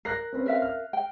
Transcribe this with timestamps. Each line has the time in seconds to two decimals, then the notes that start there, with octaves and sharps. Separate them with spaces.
0.05 A#4 F#6 A#6 C7
0.33 C4 C#4 B4
0.46 A#4 E5 F5
0.62 F6
0.93 G5